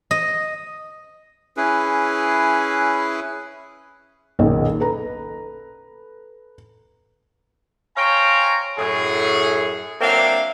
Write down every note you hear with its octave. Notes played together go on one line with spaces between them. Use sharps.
D#5
C#4 E4 G#4 B4
F#1 B1 A#2 D#3
A4 B4 A#5
C5 C#5 F5 G5 G#5 A#5
F#2 A2 G#4
F#3 A#3 C4 D4 E5 F5